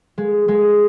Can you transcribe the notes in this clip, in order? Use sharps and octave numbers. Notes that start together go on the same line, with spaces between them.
G#3
G#3